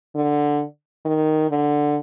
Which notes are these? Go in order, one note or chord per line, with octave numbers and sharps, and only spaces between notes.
D3
D#3
D3